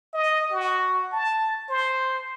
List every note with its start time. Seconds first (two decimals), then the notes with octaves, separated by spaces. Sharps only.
0.14 D#5
0.51 F#4
1.12 A5
1.69 C5